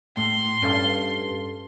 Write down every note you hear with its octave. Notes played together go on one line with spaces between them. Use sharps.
A2 C6
G2 C#4 A4 F5